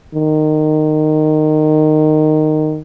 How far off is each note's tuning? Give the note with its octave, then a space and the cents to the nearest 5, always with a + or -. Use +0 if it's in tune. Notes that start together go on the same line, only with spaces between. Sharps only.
D#3 -15